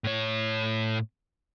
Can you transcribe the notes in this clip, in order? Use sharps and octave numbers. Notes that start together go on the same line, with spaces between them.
A2 C#5